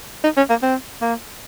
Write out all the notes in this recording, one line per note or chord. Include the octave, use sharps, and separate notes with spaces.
D#4
C#4
A#3
C4
A#3